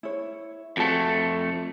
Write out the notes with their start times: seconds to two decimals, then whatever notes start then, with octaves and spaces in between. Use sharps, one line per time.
0.03 E4 C#5
0.77 F2 A3 F#4 B4 A5